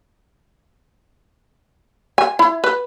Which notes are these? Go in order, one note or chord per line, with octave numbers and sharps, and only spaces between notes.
G#5
E4
B4